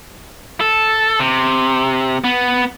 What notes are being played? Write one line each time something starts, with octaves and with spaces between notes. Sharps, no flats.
A4
C3
B3